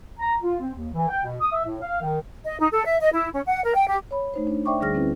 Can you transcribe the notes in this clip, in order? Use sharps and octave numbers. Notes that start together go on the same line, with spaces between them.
A#5
F4
C4
D#2
E3
G5
B2
D#6
E5
A2
F5
D#3
D#5
D#4
A4
E5
D#5
E4
C#4
F#5
A#4
G5
G4
C#5 B5
A3 D#4 C5
D4
C5 D5 E5 G5 C#6 D6
D2 D3 G3 G#4 F6 A#6
C4 C#4 E4 B4